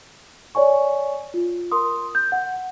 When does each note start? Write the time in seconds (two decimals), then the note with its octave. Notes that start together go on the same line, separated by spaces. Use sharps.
0.55 C#5 D5 G#5 C#6
1.34 F4
1.72 A#4 C6 D#6
2.15 G6
2.32 F#5